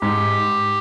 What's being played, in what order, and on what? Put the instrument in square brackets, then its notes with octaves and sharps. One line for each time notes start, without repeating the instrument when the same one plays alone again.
[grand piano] G#2 [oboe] G4